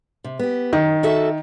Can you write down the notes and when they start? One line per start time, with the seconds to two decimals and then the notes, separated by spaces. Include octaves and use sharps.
0.24 C3
0.39 B3 G4
0.73 F#2 D#3
1.03 F#4 A4 E5